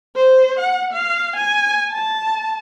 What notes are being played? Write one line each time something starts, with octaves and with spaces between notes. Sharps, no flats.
C5
F#5
F5
G#5
A5